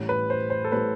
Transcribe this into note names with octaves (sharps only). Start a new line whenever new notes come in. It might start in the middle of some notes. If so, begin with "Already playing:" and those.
Already playing: A1 A2 G3
B4
C5
C5
A4
A2 G3 B4